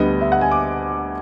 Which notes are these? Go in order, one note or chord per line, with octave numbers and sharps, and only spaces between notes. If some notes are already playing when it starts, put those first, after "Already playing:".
Already playing: D2 D3 G3 B3 D#5
E5
F#5
G#5
D6